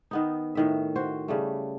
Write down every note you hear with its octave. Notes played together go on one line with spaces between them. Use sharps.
D#3 B3 D#4
A2 D#3 E5
F#4 C5
C#3 G3 A3